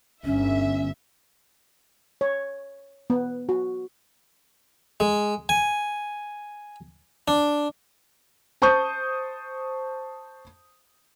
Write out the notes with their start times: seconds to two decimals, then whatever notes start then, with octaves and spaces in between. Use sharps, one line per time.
0.25 G1 C#4 E5
2.21 C#5
3.10 B3
3.49 F#4
5.00 G#3
5.49 G#5
7.28 D4
8.62 C5 A5 C#6 D#6 G6